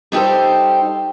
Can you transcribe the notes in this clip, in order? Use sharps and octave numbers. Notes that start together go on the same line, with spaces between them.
G3 D#4 G4 A4 C5